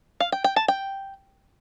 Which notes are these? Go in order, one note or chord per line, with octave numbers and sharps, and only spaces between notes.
F5
G5
G5
A5
G5